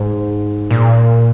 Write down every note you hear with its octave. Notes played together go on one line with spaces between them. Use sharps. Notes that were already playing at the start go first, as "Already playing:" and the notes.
Already playing: G#2
A#2